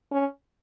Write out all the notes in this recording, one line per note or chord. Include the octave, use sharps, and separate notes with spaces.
C#4